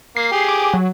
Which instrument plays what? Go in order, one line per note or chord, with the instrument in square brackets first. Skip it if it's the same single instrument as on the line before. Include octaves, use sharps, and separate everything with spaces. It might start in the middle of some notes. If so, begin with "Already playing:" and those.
[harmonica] A#3 [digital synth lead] C7
[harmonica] G4 G#4
[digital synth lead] D6
F#3